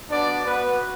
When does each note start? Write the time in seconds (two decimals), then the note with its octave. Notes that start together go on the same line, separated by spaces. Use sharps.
0.10 B3 D4 F#4 D5
0.45 B3 B4